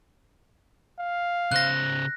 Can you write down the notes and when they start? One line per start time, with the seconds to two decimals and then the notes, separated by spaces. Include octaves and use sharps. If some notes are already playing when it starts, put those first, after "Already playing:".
0.99 F5
1.52 C#3 C5 F#6 A#6